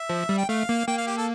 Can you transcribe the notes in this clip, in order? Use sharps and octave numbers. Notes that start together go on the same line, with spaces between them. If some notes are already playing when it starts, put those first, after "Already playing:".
Already playing: E5
F3
G3
G5
A3 F5
A#3
A#3 G5
F5
G4
A4